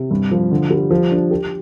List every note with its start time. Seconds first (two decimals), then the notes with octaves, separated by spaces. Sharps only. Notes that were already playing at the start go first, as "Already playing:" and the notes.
Already playing: C3
0.11 G2
0.31 F3
0.51 D3
0.70 G3
0.90 F3
1.11 D4
1.31 G4